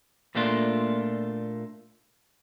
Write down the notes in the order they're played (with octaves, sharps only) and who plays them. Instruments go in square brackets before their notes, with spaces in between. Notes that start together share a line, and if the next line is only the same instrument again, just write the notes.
[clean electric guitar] A#2 A3 A#3 D4 F4